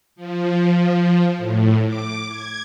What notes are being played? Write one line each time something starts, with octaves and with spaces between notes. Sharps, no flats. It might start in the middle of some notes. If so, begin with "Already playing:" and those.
F3
A2
D6
G#6